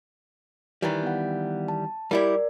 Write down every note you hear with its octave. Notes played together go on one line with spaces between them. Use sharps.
D#3 E3 G3
B3 F#5
A5
G3 E4 G4 A#4 D5